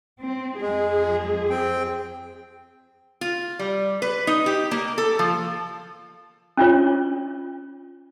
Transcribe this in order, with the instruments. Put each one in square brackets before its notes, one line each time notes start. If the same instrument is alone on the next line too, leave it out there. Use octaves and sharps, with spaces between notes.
[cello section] C4
[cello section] F2 G#4 [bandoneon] G#3
[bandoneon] C4 G5
[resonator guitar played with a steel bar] F4
G3
B4
D#4
G4
A#3
A4
F3
[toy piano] C#4 D4 F4 C#5